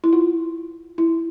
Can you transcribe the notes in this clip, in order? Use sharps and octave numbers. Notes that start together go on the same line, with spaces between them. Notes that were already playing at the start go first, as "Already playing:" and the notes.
E4
F4
E4